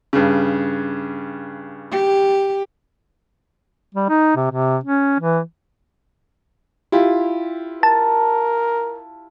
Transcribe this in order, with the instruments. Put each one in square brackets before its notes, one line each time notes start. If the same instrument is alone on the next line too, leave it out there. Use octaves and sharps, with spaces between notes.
[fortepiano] G2 C#3
[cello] G4
[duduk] G3
D#4
C3
C3
C#4
E3
[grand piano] E4 F4 G4
[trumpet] A#4 [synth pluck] A5